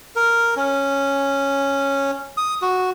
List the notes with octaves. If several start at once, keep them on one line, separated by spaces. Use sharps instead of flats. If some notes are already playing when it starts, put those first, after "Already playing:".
A#4
C#4
D#6
F#4